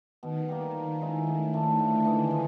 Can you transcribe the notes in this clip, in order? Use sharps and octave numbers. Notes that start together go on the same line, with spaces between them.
B2 D#3
G3 A#3
F3
G#3 C#4 E4
A2 D#3
F3 A3 D4
A2 D3
E3 G#3
F3